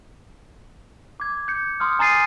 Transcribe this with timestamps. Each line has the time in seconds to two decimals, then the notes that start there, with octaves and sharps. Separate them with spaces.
1.20 D6 G#6
1.48 G6 C#7
1.80 C6 D#6 F6
1.99 G#5 A#5 D#6 A6 C7 D#7